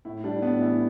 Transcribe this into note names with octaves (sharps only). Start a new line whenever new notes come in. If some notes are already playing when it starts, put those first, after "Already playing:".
A2 E4
G3 D4
A2 B3
E3 E4